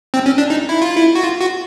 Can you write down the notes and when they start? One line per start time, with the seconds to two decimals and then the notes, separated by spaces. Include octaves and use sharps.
0.14 C4
0.26 C#4
0.38 D4
0.50 D#4
0.69 E4
0.82 F4
0.97 E4
1.15 F#4
1.23 F4
1.41 F#4